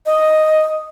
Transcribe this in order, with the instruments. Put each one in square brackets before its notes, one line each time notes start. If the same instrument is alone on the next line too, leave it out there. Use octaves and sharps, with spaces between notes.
[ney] D#5